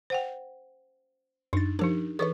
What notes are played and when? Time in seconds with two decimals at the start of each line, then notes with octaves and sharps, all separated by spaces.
0.10 C5 F#5 G5
1.53 F#2 D4 D#4 A6
1.79 F3 D4 D#4 G4 A#4
2.19 E3 G#4 A4 B4 C#5 C#6